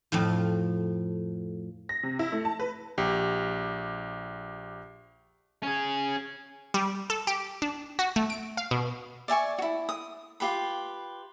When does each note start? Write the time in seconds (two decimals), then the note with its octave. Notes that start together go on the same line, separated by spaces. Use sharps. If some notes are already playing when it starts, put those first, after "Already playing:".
0.12 F2 A2 F3
1.89 A#6
2.03 C3
2.19 E4
2.32 A3
2.45 A5
2.60 B4
2.98 A#1 G4
5.63 C#4 G#4
6.74 G3
7.10 A4
7.27 G4
7.62 D4
7.99 F#4
8.16 A3
8.30 D7
8.57 F5
8.71 B2
9.28 D5 E5 G#5 C#6
9.58 E4 F#4
9.89 D#6
10.40 F4 G4 B4 B5